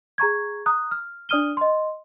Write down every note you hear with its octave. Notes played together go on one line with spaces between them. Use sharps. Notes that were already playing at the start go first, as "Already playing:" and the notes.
G#4 A#5 C#6 G#6
A#5 D#6 F#6
F6
D4 D5 D#6 F6 D#7 G7
D#5 C6